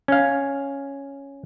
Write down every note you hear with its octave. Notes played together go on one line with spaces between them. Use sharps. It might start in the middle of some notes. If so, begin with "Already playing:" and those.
C#4 F5